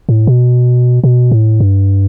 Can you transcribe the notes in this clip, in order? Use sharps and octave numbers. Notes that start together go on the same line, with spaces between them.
A2
B2
B2
A2
G2